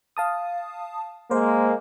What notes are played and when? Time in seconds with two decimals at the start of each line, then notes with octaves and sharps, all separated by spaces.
0.17 F5 A5 D#6
1.31 G#3 A#3 C5